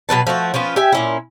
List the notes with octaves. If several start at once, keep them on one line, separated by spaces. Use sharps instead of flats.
B2 F#3 B4 A5
F3 A3 E4 F#4
F3 B3 C#4 F4
G4 E5 G#5
A#2 C#4 E4